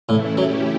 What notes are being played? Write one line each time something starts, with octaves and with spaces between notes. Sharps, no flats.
A2 C#3 E3 A3 E4
F#3 A3 C#4 E4 G4